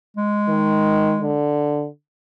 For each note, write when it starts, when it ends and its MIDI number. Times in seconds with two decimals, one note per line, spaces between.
0.17 1.38 56
0.48 1.16 51
1.22 1.87 50